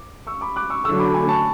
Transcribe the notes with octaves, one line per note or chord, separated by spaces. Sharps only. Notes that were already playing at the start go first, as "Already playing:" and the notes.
Already playing: D6
C#6 E6
B5 D6
D6 F#6
C#6 E6
D3 F#3 A3 C#6 E6
B5 D6
G#5 B5
A5 C#6